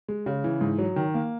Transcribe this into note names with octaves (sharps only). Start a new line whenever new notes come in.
G#3
C#3
E3
G#2
F#3
D#3
A#3